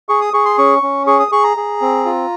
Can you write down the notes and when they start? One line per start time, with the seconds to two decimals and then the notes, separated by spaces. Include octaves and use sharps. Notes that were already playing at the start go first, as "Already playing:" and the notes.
0.09 G#4 C#6
0.21 D#6
0.33 G#4 C#6
0.45 C6
0.58 C#4 C#6
0.82 C#4
1.07 G#4 C#6
1.20 D#6
1.32 G#4 C#6
1.44 A#5
1.57 G#4
1.81 C4
2.05 F4